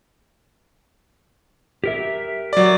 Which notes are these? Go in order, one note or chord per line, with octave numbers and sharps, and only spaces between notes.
G4 A#4 E5
F#3 D5